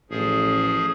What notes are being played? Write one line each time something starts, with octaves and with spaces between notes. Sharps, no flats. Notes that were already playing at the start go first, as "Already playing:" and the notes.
A1 F3 G#4